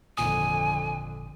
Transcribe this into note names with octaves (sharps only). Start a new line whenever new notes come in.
G#1 F2 A#2 D3 G#5 D#6